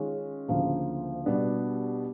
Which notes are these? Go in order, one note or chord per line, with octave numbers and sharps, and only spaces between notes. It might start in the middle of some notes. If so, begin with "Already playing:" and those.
Already playing: D#3 G#3 C#4 F4
D2 C#3 F3 A#3
B2 G3 B3 D4